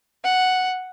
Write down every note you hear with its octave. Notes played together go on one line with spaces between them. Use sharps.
F#5